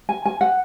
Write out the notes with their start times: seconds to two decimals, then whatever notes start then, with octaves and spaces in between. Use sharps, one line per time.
0.09 G#5
0.26 G#5
0.41 F#5